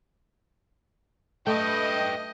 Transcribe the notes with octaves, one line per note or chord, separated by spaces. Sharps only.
A3 G4 B4 D#5 G5